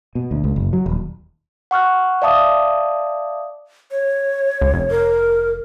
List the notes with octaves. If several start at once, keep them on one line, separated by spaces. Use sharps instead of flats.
B2
D2
C#2
F#1
F#3
D#1
F#5 C#6 F6 F#6
D5 E5 F5 A5 D6 D#6
C#5
C#2
F1
A#4